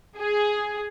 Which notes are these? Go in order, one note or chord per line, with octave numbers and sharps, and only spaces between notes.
G#4